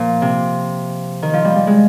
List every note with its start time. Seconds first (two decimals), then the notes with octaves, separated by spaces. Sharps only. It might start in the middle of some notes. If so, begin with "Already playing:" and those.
Already playing: A#2 F3
0.22 C3
1.22 D#3
1.33 F3
1.45 G3
1.56 G3
1.67 G#3